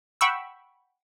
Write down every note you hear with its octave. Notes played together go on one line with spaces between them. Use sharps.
F#5 G5 B5 C#6 E6